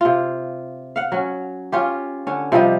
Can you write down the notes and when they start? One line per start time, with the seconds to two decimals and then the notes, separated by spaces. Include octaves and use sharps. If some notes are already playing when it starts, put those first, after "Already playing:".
0.01 C3 F4
0.96 F5 F#5
1.12 F#3 C#4
1.72 C#4 F4 G4
2.27 D3 C#4
2.52 C3 F3 G3 D#5